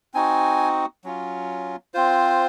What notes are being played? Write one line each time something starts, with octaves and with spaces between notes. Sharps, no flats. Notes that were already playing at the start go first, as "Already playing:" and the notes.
C4 D#4 F#4 G#5
F#3 C#4 F4
C4 F4 C5